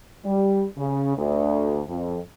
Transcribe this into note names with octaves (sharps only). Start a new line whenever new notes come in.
G3
C#3
D2
F2